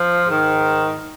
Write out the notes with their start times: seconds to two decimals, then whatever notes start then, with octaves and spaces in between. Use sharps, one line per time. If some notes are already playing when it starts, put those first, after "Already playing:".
Already playing: F3
0.25 G#2 D#3